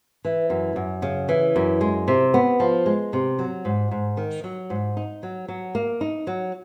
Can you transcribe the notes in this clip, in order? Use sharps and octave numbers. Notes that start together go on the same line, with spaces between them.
E3
F#2
F#2
C#3
E3
F#2
G#3
C3
B3
F3
G#3
C3
F#3
G#2
G#2
D#3
F#3
G#2
D#4
F#3
F#3
A#3
D#4
F#3